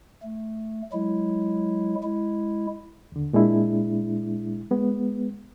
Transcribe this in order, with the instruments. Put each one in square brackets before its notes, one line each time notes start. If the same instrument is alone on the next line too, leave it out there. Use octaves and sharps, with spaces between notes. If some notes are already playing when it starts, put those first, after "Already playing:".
[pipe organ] A3
F#3 G#3 E4
G#3 E4
[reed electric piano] D#2 D3
A#2 G#3 D4 E4
G#3 B3